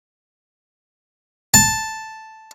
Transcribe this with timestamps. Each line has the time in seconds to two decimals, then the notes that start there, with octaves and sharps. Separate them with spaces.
1.54 A5